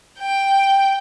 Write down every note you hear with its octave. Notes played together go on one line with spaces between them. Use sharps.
G5